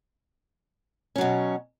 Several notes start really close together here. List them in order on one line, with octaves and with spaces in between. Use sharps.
C#4 F#3 B2